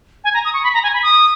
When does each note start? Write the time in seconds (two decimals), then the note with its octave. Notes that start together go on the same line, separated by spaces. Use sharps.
0.24 G#5
0.34 A#5
0.45 D#6
0.54 C#6
0.63 B5
0.74 A#5
0.83 G#5
0.94 B5
1.03 D#6